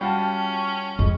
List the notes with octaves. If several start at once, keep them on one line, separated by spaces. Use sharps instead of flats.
G3 C#4 F4 F#4 G5 A5
F2 G#3